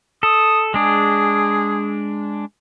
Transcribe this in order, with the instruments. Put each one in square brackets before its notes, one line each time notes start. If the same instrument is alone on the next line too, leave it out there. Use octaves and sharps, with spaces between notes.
[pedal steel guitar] A4 [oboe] D#6
[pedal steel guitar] G#3 D4 [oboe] G#4